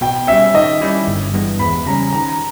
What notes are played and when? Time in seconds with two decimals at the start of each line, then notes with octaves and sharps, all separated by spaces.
0.01 B2 G5
0.27 G3 C#4 E5
0.54 D#3 D#5
0.81 G3 C#4 E4 G4
1.07 G1
1.33 G2 E3 G#3 B3
1.59 E2 B5
1.86 C#3 G3 C#4 A#5
2.13 D#3 A#5